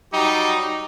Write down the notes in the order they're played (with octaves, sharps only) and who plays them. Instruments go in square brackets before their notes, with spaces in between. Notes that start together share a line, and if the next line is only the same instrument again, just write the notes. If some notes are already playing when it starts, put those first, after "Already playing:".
[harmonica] F#3 G3 G4 [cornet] D#4